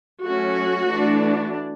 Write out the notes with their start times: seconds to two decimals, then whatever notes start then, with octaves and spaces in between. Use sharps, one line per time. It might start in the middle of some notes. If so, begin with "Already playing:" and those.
0.23 F#3 A3 C#4 F#4
0.89 E3 A3 D4